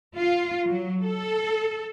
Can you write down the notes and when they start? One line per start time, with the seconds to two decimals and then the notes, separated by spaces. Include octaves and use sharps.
0.16 F4
0.67 F#3
1.02 A4